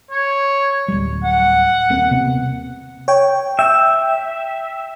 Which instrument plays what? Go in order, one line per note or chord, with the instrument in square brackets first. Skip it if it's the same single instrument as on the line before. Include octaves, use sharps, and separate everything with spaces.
[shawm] C#5
[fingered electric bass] D1 G3
[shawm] F#5
[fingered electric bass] D#1 A#3 C4
C3 A#3 B3
[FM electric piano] C#5 G5
[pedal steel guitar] E5 [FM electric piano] G5